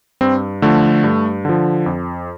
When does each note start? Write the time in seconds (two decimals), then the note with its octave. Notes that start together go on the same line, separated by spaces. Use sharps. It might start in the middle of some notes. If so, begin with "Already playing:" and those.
0.21 G2 C4
0.62 D3 F3 A3
1.04 G2
1.45 D3 F3
1.86 F2